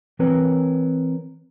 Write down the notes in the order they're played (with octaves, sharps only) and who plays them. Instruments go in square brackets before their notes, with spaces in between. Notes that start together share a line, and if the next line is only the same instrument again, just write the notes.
[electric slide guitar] E3 C4 A#4 B4 C#5